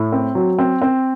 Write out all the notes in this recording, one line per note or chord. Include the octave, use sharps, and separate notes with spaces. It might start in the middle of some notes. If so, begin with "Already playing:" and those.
Already playing: A2
C4
F#3
C4
C4